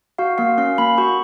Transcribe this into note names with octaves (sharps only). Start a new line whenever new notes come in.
F#4 F5
A#3 F5
C#4 F5
A#3 B5
F#4 C#6